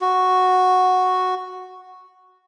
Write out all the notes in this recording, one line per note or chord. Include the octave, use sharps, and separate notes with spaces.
F#4